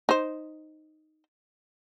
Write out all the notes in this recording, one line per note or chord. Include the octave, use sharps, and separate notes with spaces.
D#4 C5